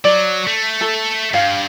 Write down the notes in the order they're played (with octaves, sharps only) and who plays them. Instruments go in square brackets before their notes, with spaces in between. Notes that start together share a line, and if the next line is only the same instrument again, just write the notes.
[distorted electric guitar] F#3 [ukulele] D5
[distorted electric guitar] A3
[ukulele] A4
[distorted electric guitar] G2 [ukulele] F5